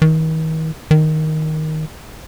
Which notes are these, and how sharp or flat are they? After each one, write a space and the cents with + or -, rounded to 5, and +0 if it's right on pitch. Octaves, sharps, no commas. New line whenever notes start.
D#3 +40
D#3 +5